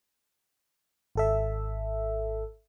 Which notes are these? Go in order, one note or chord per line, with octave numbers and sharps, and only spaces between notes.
G#1 A4 E5